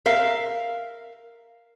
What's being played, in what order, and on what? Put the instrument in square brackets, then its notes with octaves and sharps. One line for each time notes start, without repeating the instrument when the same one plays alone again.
[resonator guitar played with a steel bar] A#4 E5 F5